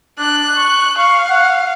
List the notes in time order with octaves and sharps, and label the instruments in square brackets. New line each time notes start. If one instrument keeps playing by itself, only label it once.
[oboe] D4 [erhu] F#6
[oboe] C#6
[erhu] F5 [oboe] C#6
[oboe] F#5